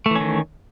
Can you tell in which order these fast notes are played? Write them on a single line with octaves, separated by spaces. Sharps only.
A3 E3 C#4 D#3